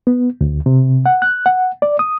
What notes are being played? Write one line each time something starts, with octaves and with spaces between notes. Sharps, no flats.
B3
D2
C3
F#5
F#6
F#5
D5
D#6